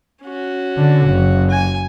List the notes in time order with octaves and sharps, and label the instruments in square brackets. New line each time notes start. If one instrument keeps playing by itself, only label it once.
[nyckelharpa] C#4 F#4
[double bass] D3
F#1
[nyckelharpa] G#5